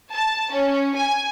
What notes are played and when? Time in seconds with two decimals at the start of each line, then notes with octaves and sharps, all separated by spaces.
0.11 A5
0.52 C#4
0.94 G#5